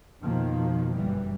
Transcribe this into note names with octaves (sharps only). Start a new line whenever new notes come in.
F2 B2 D#3 F3 A#3
G1 F#2 E3 G3